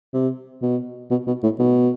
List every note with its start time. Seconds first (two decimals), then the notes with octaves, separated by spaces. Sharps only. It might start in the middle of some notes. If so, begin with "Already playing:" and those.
0.13 C3
0.62 B2
1.11 B2
1.27 B2
1.43 A2
1.59 B2